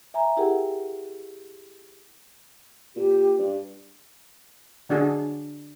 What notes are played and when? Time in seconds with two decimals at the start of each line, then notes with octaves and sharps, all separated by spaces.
0.14 E5 G#5 A#5
0.37 E4 G4 G#4 A#4 F#5 G5
2.96 A#2 G4
3.39 G2
4.89 D3 D4 F#4 G#4